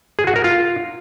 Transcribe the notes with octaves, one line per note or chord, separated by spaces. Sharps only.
G#4
F#4
A#4
F4